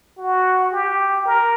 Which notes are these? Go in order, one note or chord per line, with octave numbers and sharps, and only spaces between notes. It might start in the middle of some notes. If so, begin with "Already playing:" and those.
F#4
G4
A#4